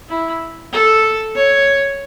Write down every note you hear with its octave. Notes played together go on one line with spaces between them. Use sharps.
E4
A4
C#5